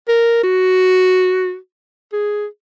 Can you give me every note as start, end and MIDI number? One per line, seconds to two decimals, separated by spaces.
0.08 0.43 70
0.43 1.56 66
2.13 2.46 68